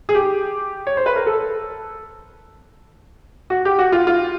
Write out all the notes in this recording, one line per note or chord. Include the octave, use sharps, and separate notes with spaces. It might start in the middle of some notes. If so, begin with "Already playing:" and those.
G#4
G4
C#5
C5
B4
A#4
A4
F#4
G4
F#4
F4
F4